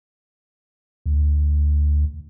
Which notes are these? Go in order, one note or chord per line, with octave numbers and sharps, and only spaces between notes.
D2